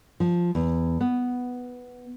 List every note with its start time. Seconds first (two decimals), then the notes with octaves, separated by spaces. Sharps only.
0.20 F3
0.55 E2
1.01 B3